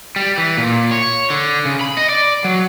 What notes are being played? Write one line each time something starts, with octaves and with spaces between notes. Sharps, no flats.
G3
E3
A#2
C#5
D3
C#3
B5
D#5
D5
F#3